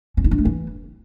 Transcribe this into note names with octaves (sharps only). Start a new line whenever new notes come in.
C#4
D#4
D4
A3
E3